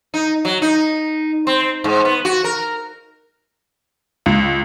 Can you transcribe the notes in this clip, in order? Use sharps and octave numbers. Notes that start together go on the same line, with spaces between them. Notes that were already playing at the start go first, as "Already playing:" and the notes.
D#4
F#3
D#4
C4
G#2
B3
F#4
A#4
C#2